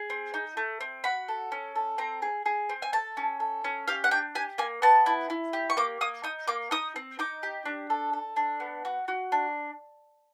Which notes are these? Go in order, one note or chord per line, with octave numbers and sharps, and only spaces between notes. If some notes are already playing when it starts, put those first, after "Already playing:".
Already playing: G#4
C4
D#4
A3
C4
F#4 B5
A4
C#4
A4
C4 A#5
G#4
G#4
C4
G#5
A4 A5
C#4
A4
C#4
G4 F5
F#5
D4 G5
G4 G#5
A#3 G#5
B3 A5
E4
E4
G4
C#6
A#3 D6
A#3 D#6
D#4 D#6
A#3 D6
D#4 D#6
C4
D#4 D6
G4
D4
A4
A4
D4
B3
F#4
F#4
D4